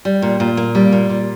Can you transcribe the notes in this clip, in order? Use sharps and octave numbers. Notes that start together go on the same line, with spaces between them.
G3
A#2
A#2
A#3
G3
A#2
A#2